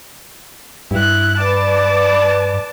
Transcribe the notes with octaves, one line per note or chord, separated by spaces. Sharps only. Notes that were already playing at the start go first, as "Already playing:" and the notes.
G2 E4 F#6
B4 D5 A5 D6